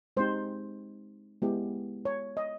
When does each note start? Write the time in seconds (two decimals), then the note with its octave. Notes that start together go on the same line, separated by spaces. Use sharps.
0.17 G#3 C4 D#4 G4 C5
1.42 G#3 B3 E4 G4
2.05 C#5
2.37 D#5